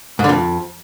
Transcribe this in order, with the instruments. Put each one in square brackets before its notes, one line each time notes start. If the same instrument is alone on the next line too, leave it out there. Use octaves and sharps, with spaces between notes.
[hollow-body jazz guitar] G#2
D3
F2